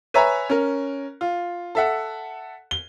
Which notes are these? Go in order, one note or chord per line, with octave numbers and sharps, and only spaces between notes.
B4 C#5 E5 G#5 A#5
C#4 A#4
F4
A4 E5 F#5
G7